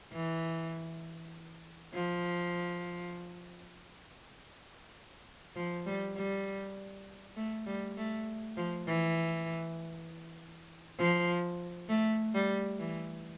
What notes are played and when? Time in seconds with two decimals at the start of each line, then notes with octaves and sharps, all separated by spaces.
0.12 E3
1.94 F3
5.56 F3
5.86 G3
6.15 G3
7.37 A3
7.66 G3
7.97 A3
8.57 F3
8.87 E3
10.98 F3
11.89 A3
12.34 G3
12.80 E3